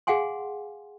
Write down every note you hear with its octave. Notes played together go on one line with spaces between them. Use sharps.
G#4 F5 F#5 G#5 C6